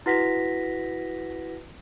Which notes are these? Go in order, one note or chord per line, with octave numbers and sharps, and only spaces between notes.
E4 F#4 B4 F#5 A#6 B6